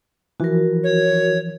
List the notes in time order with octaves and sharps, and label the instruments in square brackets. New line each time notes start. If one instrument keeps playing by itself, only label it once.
[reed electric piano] E3 F3 [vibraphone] F#4 A#4
[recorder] C#5